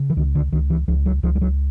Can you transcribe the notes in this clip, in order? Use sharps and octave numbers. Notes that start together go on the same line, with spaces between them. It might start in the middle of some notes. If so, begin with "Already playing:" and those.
Already playing: C#3
E3
C#2 D#3
D3
C#2 D#3
E3
C#2 F3
F#3
C#2 F3
G3
F#3